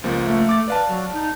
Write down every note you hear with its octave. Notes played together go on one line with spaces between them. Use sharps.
C#2 F3 A#3
A3
D6 A6
B4 D5 F5 A5
F#3
D#4